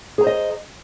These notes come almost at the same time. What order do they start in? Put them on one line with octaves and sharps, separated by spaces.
G#4 A#5 C5 D#5